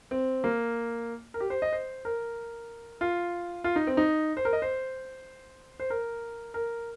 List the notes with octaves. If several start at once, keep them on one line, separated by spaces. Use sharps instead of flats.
C4
A#3
A#4
G4
C5
D#5
C5
A#4
F4
F4
D#4
C4
D#4
C5
A#4
D#5
C5
C5
A#4
A#4